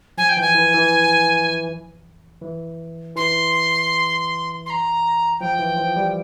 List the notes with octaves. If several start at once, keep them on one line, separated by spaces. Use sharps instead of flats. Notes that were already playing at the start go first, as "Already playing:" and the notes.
F3 G#5
G5
E3 G#5
E3
E3
E3
E3 C6
C6
A#5
F3 G5
E3
F3
G3